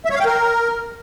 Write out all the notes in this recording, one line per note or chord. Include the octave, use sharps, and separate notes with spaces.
E5
C#5
F5
G5
A#4